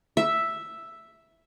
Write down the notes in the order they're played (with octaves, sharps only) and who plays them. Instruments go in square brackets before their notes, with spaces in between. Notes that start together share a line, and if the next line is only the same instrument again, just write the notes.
[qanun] E5